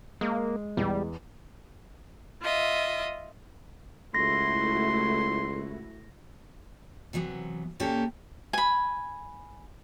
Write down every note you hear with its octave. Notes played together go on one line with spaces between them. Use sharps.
G#3 A#3
E2 G3
F4 D#5 E5
C#2 A3 E4 F#4 C6 A#6
C3 E3 F#3 B3
A#2 A#3 C#4 G4 A4
G#5 B5